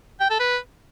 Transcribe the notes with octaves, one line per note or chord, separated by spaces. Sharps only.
G5
A4
B4